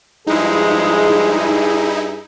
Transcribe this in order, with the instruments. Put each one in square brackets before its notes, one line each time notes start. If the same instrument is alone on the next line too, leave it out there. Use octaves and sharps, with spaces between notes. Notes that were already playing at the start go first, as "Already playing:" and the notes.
[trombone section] G2 G#4 [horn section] F3 G#3 [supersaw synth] D#4 E4